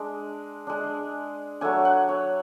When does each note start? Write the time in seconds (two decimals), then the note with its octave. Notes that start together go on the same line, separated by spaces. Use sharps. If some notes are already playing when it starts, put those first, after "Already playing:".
Already playing: G#3 D4
0.67 G#3 D4
1.61 F#3 A3 D4 G#5
1.85 F#5
2.09 C#5